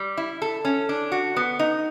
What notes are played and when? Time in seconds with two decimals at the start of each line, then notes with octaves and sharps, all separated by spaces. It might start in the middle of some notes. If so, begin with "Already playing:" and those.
Already playing: G3
0.17 E4
0.42 A4
0.65 C#4
0.89 D4
1.12 F#4
1.36 B3
1.59 D#4